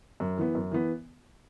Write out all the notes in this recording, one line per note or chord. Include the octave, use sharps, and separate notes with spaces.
F#2
E3 B3
F#2
E3 B3